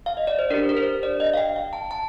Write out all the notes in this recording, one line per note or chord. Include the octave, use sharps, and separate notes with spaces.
F5
D#5
D5
C5
D4 G4 A#4
A#4
C5
D5
D#5
F5
G5
F5
A5
A5